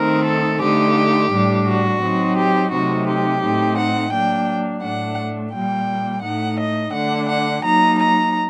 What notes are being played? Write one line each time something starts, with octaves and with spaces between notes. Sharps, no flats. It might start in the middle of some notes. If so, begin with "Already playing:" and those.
Already playing: D#3 A3 C4 D#4 A#4
A4
D3 A3 D#4 G4
A2 G3 D4
F#4
F#3 C4 D#4
G4
C3 F#3 A3 C4 D#4 F#4
G4
A2 A3 C4 D#4
F#5
F#3 A#3 D4 G5
A2 A3 D4 F#5
A#2 G3 A#3 G5
A2 A3 D#4 F#5
D#5
D3 A3 D4 F#5
F#5
F#3 A#3 D#4 A#5
A#5